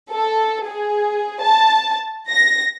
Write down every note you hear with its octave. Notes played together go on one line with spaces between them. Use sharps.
A4
G#4
A5
A#6